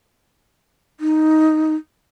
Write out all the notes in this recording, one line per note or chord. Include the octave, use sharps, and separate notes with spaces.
D#4